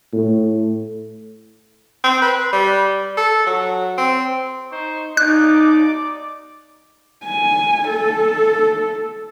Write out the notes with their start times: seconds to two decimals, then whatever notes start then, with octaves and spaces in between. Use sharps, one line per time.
0.13 A2
2.04 C4
2.22 B4
2.53 G3
3.17 A4
3.46 F#3
3.98 C4
4.72 D#4 C5 C#6
5.17 D#4 D5 D6 F#6
7.24 G#5
7.88 A4